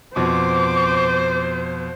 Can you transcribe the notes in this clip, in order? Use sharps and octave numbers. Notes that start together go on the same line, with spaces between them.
F2 B2 C5 D6